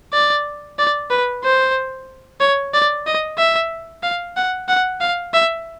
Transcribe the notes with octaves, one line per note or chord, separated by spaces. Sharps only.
D5
D5
B4
C5
C#5
D5
D#5
E5
F5
F#5
F#5
F5
E5